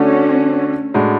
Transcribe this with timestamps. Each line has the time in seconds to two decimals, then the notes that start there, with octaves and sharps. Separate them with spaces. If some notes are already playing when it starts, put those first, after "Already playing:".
Already playing: D3 A3 C#4 D4 F#4 A4
0.94 A2 G#3 D4 F#4